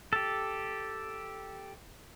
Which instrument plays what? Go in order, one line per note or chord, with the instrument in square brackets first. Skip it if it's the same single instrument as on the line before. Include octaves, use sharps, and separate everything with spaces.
[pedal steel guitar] G4 A4